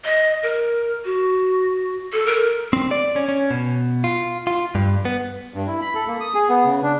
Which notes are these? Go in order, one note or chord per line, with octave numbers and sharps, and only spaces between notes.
D#5
A#4
F#4
A4
A#4
C4
D5
C#4
C#4
B2
F4
F4
G2
B3
G2
E4
B5
A4
A#3
D#6
G#4
B3
C#3
D4